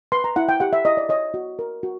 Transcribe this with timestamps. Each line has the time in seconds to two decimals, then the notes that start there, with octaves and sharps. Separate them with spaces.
0.12 B4 C6
0.24 A#5
0.36 E4 F#5
0.49 G5
0.60 G4 F#5
0.73 E5
0.85 E4 D#5
0.97 D5
1.09 C#5 D#5
1.34 F#4
1.59 A#4
1.83 F#4